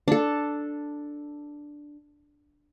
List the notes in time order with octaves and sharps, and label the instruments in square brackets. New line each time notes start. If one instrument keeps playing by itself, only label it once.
[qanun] D4 A4